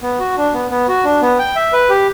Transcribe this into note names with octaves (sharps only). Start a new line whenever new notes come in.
B3
F#4
D4
B3
B3
F#4
D4
B3
G5
E5
B4
G4